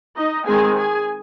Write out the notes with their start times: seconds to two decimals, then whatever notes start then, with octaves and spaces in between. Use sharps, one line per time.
0.17 D#4 D#5
0.46 D#3 G#3 C4 G#4 G#5
0.77 G#4 G#5